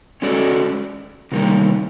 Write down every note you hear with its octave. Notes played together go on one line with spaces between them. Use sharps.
G#3 C#4 F#4 A4 D5
C3 D#3 G3 A#3